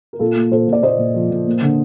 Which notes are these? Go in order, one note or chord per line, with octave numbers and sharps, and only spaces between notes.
A#4
A#2 F4 A4
A#3
A#2 A4 C5
A#2 D5
A#2 C5 D#5
A#2
F3
A#2
A#3
D3